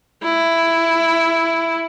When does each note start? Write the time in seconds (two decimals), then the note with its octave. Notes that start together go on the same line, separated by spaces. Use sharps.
0.24 E4